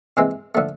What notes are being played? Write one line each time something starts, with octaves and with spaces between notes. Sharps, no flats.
C3 E3 G#3 C4
D3 F3 A3